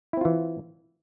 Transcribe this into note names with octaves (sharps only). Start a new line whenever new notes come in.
E3 C4 E4 F4